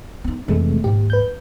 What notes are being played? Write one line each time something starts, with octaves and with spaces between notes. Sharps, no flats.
B3 D#4
F2 C3 E3 G#3 A3
D#2 G#2 G4
B4 G6